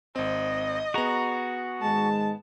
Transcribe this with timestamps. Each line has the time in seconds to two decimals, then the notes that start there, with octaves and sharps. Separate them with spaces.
0.16 G#1 C4 D#5
0.94 B3 F#4 G#4 A#5
1.82 G#2 D#3 G#3 A5